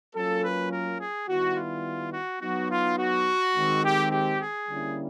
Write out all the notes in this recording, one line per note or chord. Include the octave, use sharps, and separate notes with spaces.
F#3 A#3 C#4 F4 A4
B4
A#4
G#4
D#3 G3 B3 E4 F#4
F4
F#4
F#3 B3 D#4 F#4
F4
F#4
D#3 G#3 C4
G4
G4
G#4
D3 G3 A#3 C#4 E4